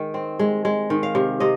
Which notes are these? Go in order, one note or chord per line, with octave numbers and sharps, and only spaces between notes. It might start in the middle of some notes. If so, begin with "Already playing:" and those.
Already playing: D#3 G#3 G5
C4
G#3
G#3
D#3
F5
C3
C3 D#5